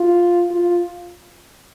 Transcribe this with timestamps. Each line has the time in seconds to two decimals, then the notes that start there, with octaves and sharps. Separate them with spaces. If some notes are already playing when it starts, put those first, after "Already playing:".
Already playing: F4
0.51 F4